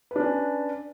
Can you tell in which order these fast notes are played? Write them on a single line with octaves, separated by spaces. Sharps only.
B4 D4 C#4 D5